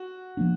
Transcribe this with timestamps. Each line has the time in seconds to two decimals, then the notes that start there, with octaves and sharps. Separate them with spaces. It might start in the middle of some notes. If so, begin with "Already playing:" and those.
Already playing: F#4
0.37 F3 A#3 D4